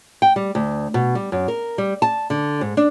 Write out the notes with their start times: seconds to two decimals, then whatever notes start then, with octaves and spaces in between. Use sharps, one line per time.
0.22 G5
0.36 G3
0.55 D2
0.94 B2
1.15 G3
1.32 F#2
1.48 A#4
1.78 G3
2.02 A5
2.30 D3
2.61 G#2
2.77 D4